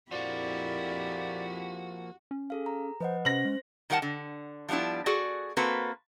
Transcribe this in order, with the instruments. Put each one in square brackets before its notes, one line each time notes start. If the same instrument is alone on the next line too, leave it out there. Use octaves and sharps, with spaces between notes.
[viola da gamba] F2 E4 G4 [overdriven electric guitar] F3 A#3 [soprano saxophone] F#4 [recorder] D5
[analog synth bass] C#4
[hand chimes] G#4 A4 F5
A#5
[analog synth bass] F3 [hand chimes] B4 D#5 F#5 [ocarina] C5
[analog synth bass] C3 [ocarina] C#4 [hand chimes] C5 [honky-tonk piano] A#6 F#7
[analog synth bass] G#3
[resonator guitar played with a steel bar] D#3 G3 A#4 F#5 A5
D3
F3 G3 B3 D4 E4
F#4 G#4 A4 D5
A#3 C4 F#4 A4 B4